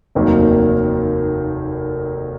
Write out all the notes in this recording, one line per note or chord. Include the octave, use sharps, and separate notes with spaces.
F1 D#2 D#3 F#3 A#3